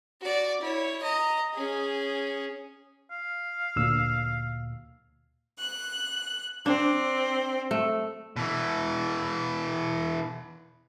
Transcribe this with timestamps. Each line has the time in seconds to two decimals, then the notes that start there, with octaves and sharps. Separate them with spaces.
0.21 F#4 D5
0.61 E4 C#5
1.02 D#5 A#5
1.54 C#4 G#4
3.11 F5
3.76 D2 A#2 E6
5.58 F#6
6.66 C4 D4
7.71 A3
8.36 B2 E3